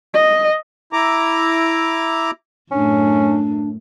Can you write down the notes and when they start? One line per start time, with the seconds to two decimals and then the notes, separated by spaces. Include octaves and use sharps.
0.14 D#5
0.93 E4 A#5 D6
2.72 F#2 A2 C#4 D4